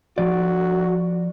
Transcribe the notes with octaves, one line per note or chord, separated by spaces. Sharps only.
F3 F#4 D5